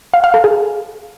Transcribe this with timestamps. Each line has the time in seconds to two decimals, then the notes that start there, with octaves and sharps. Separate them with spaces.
0.14 F5
0.24 F5
0.34 A4
0.44 G#4